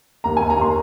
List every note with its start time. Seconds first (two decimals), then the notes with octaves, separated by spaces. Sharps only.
0.24 D#2 A#5
0.37 G#5
0.41 D#2
0.50 A#5
0.57 D#2 C6